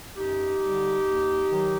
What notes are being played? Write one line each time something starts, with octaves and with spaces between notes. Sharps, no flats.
F#2 D#4 G4
D3 G3
D#2
D#3 F#3